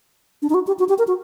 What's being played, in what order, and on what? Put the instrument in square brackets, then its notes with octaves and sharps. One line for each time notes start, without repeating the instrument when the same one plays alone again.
[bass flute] D4
D#4
F#4
G4
F#4
G4
A#4
F#4